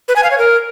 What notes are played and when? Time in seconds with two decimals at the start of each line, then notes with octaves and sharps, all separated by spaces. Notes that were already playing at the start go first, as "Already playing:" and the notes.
0.08 B4
0.16 G#5
0.23 F5
0.31 C#5
0.38 A#4